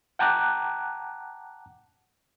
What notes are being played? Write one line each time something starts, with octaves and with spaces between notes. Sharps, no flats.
F#5 G5 A5 A#5 D6 F#6